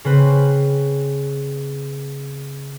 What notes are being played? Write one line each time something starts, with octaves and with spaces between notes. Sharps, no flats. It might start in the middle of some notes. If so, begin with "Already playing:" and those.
C#3 C4 B4